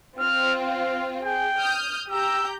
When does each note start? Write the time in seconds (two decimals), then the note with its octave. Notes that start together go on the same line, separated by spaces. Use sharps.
0.20 C4 F4 F6
0.63 F5
1.25 G#4 G5
1.60 D#6 F6 G6
2.11 G4 A#5 E6 G6